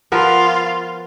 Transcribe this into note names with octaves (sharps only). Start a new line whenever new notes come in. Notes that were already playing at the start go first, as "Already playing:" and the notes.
F3 B3 F4 A#4